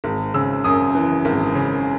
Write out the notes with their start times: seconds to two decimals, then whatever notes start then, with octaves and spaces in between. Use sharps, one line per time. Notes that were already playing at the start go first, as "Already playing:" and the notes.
0.04 G#1
0.34 C#3 E6
0.64 F#2 D#6
0.95 E3
1.25 G#1
1.55 C#3